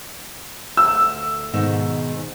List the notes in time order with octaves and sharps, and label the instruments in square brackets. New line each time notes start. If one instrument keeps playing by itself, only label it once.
[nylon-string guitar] D2 [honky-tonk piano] E6
[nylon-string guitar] G#2 B2 D#3